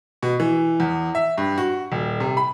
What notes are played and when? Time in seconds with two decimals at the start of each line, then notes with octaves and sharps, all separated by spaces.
0.23 B2
0.40 E3
0.80 E2
1.15 E5
1.38 G2
1.58 F#4
1.92 D#1
2.20 C3
2.37 B5